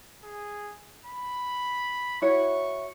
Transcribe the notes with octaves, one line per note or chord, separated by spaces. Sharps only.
G#4
B5
E4 F#4 C#5 C#6